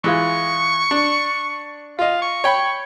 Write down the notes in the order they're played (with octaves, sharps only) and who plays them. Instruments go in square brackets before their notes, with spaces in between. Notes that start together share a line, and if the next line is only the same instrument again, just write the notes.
[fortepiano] E3 G#3 F4 [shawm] C#6
[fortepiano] D4
[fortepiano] F4 D#5 [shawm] F5
[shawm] C#6
[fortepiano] C#5 G5 B5